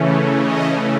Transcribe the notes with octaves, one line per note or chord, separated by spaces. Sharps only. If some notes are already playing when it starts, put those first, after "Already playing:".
Already playing: C#3 E3 A3 C#4
D#5